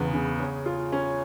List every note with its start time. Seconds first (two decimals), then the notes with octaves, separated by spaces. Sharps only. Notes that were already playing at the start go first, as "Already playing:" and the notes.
Already playing: E2 C#3 B3
0.14 C#3
0.40 C#4
0.66 F4
0.92 C#4